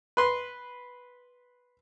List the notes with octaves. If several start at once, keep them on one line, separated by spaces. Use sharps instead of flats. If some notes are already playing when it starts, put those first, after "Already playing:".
B4 C6